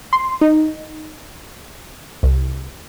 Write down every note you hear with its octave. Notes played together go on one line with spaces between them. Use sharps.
C6
D#4
C2